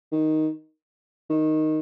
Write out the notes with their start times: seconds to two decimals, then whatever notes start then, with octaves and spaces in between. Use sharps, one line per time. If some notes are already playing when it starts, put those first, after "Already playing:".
0.12 D#3
1.30 D#3